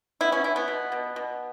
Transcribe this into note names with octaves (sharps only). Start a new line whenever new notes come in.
B3 E4
C#4
B3 E4
B3
B2
B2
B2